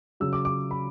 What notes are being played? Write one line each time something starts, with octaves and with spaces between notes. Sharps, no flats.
C#3 F#3 E6
D6
D6
B5